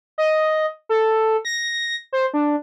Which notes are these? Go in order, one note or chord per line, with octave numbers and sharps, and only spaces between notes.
D#5
A4
A#6
C5
D4